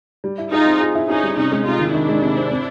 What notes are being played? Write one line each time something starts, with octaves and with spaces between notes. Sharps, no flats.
G3
E4
D#4 F4 G#4
C4
G#4
E4
C#4 D#4 G#4
G3
C3 C#4 D#4
G#3
C3 D#4 F4
D#3
D#3 D4 E4
G#3
C3
C4
C4